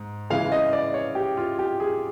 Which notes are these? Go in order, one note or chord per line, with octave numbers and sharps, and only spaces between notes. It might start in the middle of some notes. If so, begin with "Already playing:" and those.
Already playing: G#2
C#3 E3 G#3 F5
D#5
D5
C#5
G4
F4
G4
G#4